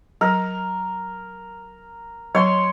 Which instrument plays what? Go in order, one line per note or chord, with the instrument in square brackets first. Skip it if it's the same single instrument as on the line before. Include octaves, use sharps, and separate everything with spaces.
[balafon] F#3 [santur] A#4
[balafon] F#3 [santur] C#5 C6